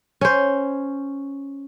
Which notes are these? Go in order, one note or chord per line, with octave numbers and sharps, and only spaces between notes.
C#4 C5